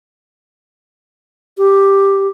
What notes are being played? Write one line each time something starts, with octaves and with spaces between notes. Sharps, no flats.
G4